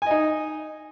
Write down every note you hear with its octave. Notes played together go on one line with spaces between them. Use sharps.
D#4 D#5 G#5